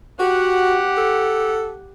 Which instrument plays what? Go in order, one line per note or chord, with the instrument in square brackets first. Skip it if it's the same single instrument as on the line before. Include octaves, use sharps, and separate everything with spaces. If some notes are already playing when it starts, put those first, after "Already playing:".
[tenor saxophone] F#4 [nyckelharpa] G4 F#5
[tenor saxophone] A4